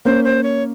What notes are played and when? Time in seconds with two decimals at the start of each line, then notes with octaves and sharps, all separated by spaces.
0.05 A#3 C#4 C5
0.24 C5
0.43 C#5